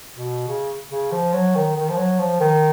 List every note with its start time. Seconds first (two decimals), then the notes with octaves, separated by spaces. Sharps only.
0.16 B2
0.48 C#3
0.91 C#3
1.12 F3
1.33 F#3
1.55 D#3
1.76 D#3
1.89 F3
1.97 F#3
2.19 F3
2.40 D#3